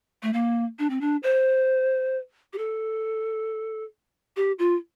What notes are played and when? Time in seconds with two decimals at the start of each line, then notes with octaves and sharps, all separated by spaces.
0.23 A3
0.33 A#3
0.79 D4
0.90 C4
1.01 D4
1.23 C5
2.53 G4
2.58 A4
4.36 G4
4.59 F4